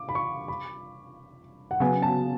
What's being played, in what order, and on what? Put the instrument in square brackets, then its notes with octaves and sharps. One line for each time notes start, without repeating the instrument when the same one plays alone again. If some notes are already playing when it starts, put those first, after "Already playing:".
Already playing: [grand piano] D6
B5
C#6
B5
F#5
[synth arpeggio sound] C#3 F#3 B3 [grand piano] G#5
[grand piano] A5